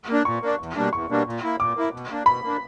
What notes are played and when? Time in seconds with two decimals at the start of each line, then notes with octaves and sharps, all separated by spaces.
0.09 A#3 D4
0.25 A#2 C#6
0.42 A#3 D4
0.59 E2
0.76 B2 G3 A#3 D4
0.93 E2 C#6
1.09 B2 G3 A#3 D4
1.26 A#2
1.43 A#3 E4
1.60 A#2 D6
1.76 A#3 E4
1.93 B2
2.10 A#3 D4
2.26 B2 B5
2.44 A#3 D4